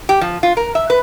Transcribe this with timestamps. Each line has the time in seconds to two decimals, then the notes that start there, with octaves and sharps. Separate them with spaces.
0.09 G4
0.21 F3
0.43 F4
0.57 A#4
0.75 E5
0.90 B4